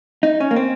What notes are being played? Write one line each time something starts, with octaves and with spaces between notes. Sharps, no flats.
D#4
C#4
A#3
C4